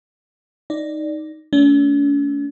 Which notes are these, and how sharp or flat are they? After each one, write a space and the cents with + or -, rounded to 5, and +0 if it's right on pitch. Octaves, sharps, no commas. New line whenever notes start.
D#4 +0 D5 +0
A3 +0 C#4 +45